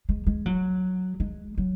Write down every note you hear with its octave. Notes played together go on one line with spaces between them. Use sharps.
G#3
G#3
F#3
G#3
F#3